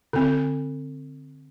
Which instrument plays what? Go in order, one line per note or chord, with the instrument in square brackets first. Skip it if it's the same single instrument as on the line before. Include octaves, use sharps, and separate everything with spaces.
[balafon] D3 C4